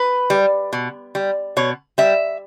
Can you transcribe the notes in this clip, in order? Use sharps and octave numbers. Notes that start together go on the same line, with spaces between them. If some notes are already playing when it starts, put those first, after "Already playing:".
Already playing: B4
G3
B2
G3
B2 C#5
G3 E5